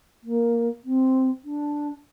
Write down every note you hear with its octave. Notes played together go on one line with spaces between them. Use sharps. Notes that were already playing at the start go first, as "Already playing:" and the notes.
A#3
C4
D4